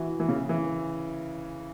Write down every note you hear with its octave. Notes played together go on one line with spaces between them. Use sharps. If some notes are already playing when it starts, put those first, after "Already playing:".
Already playing: E3 F#4
E3
C#3
E3